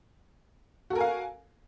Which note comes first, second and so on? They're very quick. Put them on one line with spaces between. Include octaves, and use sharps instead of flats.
F#4 A4 A#4 G#5 F5